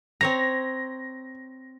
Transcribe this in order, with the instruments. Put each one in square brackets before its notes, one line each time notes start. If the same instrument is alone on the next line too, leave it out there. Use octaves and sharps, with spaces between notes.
[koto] C4 C#5 A#5 [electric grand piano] A#6